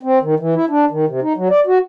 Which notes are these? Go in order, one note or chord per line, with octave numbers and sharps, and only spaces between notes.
C4
D#3
E3
E4
D4
D#3
C3
D#4
F#3
D5
F#4